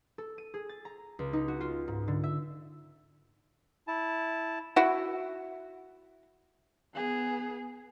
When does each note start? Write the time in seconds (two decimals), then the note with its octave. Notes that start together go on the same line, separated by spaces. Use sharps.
0.18 A4
0.38 D#7
0.54 G#4
0.69 A6
0.85 A#5
1.19 C#2
1.33 D#4
1.48 F#4
1.60 F4
1.88 G#2
2.08 D3
2.24 E5
3.87 E4 A5
4.76 E4 F#4
6.95 B3 G#4